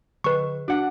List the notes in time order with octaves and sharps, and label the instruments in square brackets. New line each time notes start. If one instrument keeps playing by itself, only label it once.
[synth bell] D3 G#4 D#5 [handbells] B4 C#6
[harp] D4 F#5 [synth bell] F#4